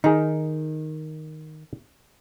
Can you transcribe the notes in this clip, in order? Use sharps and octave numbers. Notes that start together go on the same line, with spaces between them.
D#3 D#4 G#4